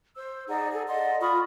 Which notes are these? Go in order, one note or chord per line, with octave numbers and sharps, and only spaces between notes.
C5 E6
D#4 G#4 D5 F#5
G#4 A4
D5 D#5 F#5 C6
F4 B5 C#6 D#6